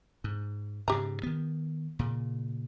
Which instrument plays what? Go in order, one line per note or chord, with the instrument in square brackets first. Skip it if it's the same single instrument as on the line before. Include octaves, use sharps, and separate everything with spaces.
[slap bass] G#2
[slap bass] G#2 C#3 [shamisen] G4 A#5
[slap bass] D#3 B3
A#2 C#3